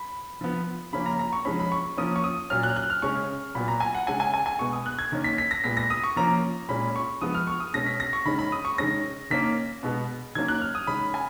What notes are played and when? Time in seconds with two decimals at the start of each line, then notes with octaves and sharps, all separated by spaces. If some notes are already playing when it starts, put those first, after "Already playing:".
Already playing: B5
0.41 F3 B3
0.93 C#3 F3 A#3 C#4 B5
1.06 A#5
1.19 A#5
1.33 C#6
1.45 F3 G#3 C#4 B5
1.60 B5
1.72 C#6
1.97 F3 A#3 C#4 D#6
2.16 C#6
2.24 D#6
2.50 A#2 F#3 C#4 F6
2.63 F#6
2.76 F#6
2.90 F6
3.02 C#3 G#3 C#4 C#6
3.55 A#2 F#3 B3 B5
3.68 A#5
3.80 G#5
3.95 F#5
4.07 C#3 G#3 C#4 G#5
4.20 G#5
4.34 G#5
4.46 G#5
4.59 B2 G#3 B3 C#6
4.73 D#6
4.86 F#6
4.99 G#6
5.12 D#3 A#3 C#4
5.24 B6
5.38 B6
5.51 A#6
5.64 A#2 G#3 B3 B6
5.77 A#6
5.90 D#6
6.04 C#6
6.16 F3 A#3 C#4 A#5
6.69 A#2 G#3 C#4 B5
6.96 C#6
7.21 F3 G#3 B3 D#6
7.35 F6
7.47 C#6
7.60 D#6
7.74 B2 G#3 C#4 A#6
7.86 B6
8.00 A#6
8.13 C#6
8.25 D#3 G#3 C#4 B5
8.39 B5
8.52 D#6
8.65 C#6
8.78 D#3 G#3 C#4 A#6
9.30 D#3 A#3 C#4 B6
9.83 B2 G#3 B3
10.35 D#3 F#3 A#3 C#4 G#6
10.48 F#6
10.61 F6
10.75 D#6
10.87 D#3 G#3 C#4 B5
11.14 G#5